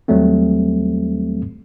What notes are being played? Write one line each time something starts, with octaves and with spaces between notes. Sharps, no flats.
D#2 F#3 G3 A3 C4